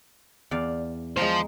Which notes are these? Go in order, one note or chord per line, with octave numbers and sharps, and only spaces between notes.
E2 D5 F5
G#3 F4 C5 G5 A#5